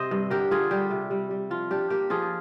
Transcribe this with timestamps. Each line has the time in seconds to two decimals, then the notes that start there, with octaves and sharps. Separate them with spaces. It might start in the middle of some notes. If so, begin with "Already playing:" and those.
Already playing: C3 C5 D#5
0.11 G2
0.30 D3 G4 A#4
0.51 D3 F4 G#4
0.71 G3 G4
0.90 C3
1.11 G3
1.31 G3
1.50 F3 F4
1.71 D4 G4
1.90 A#3 G4
2.10 F3 F4 G#4